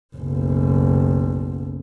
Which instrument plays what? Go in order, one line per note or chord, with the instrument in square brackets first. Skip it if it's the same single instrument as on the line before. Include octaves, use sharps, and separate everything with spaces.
[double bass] F#1 B1